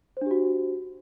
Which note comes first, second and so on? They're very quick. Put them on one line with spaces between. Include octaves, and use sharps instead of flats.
C5 D4 G4 F#4